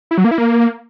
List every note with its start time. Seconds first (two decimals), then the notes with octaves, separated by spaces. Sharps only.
0.11 E4
0.18 F#3
0.24 A#3
0.31 E4
0.38 A#3